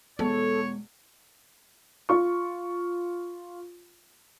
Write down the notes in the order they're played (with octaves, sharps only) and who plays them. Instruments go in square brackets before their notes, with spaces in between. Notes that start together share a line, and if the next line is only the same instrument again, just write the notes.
[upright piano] E2 B2 [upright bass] G#3 [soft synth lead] A4 [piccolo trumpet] C#5
[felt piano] F4 C#6